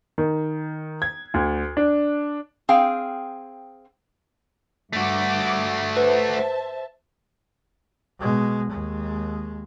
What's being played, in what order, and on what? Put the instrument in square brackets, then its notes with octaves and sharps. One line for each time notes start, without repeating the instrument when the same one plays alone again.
[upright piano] D#3
G#6
D2
D4
[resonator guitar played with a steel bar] C4 G#4 F5 G5
[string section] G2 D6 [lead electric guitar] A3 F#4
[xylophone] B4 [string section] C5 E5 A5
[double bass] B2 G#3
D#2 G#3